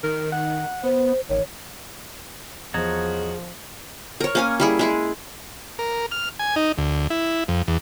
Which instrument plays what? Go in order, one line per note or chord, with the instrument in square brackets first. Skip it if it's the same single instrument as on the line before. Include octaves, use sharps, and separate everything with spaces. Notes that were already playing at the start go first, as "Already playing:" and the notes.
[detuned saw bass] D#3 [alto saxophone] A#4
[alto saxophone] F#5
[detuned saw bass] B3 [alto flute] C5
[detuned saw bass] A1 [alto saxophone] D#3 [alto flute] C#5
[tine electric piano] E2 D#5 D#6 [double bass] F3 [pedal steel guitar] F#4 C#5 A#5 [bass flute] G#4
[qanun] A#4 C#5
A#3 C#4 G#5
G3 E4 G#4
G#3 E4 G#4
[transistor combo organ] A#4
F6
G#5
D#4
D2
E4
F2
E2